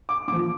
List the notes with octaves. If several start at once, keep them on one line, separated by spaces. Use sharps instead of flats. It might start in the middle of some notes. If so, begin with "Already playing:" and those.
D6
A#2 F3 D6